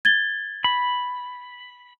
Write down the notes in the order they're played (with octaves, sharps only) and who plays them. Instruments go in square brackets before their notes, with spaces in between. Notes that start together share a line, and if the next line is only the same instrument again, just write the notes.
[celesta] G#6 A6 G7
[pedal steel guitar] B5